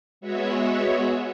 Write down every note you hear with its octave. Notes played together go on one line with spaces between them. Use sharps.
G#3 B3 F#4 C#5 E5